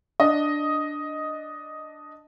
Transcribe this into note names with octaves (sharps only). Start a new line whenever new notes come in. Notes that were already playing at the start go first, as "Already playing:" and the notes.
D4 D#5